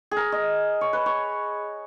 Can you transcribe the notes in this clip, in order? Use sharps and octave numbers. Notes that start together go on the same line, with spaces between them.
G#4
A#4
D#5
C#5
B4
C#5